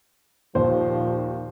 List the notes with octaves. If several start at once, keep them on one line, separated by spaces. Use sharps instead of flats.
D#2 A#2 F3 C5